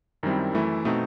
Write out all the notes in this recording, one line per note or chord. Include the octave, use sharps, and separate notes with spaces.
F#2 D#3 G3 C4 E4
F#2 E3 A3 E4
B2 A3 C4 D#4